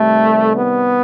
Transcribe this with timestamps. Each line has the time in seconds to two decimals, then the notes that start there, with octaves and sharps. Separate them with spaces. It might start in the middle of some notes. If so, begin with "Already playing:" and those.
Already playing: C3 D#3 G3 A3
0.55 B3